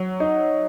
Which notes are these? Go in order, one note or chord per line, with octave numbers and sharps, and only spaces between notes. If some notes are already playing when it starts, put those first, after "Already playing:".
Already playing: F#3
D#4